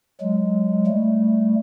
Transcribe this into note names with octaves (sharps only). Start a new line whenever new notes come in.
F#3 G#3
G3 A3